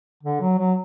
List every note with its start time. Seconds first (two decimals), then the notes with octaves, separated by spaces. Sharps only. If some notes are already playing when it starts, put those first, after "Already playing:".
0.23 D3
0.41 F#3
0.59 F#3